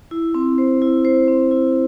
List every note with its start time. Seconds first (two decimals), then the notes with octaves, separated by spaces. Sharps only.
0.11 E4
0.34 C4
0.58 C5
0.82 E4
1.05 C5
1.28 C4
1.51 E4